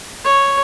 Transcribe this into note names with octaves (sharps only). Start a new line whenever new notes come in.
C#5